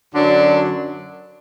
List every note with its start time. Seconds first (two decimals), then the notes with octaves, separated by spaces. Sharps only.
0.13 F#2 D3 F#3 D4